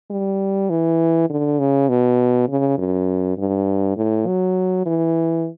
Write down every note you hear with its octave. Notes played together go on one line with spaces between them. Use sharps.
G3
E3
D3
C#3
B2
C#3
F#2
G2
A2
F#3
E3